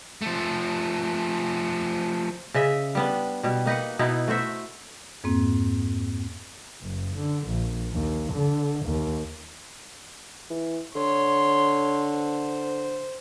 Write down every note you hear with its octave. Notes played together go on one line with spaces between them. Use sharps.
F3 A3
C#3 D#5 E5
G3 B3 D4
B2 G3
A#3 D#4 B4 F#5
B2 B3 D#4 E4
A3 F#4 C5 E5
F2 G#2 A#3 C4
F#1
D3
A#1
D#2
D3
D#2
E3
D3 C#5 C6
C5